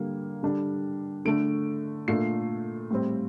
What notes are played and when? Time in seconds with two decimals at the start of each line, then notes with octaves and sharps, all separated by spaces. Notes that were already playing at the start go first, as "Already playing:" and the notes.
Already playing: D3 G3 A#3
0.43 D3 G3 D4
1.25 D3 A3 D4 D7
2.08 A#2 A3 D4 C7
2.91 A2 G3 C4